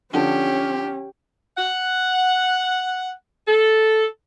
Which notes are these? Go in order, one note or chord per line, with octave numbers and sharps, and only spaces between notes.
D3 F3 C#4 G4
F#5
A4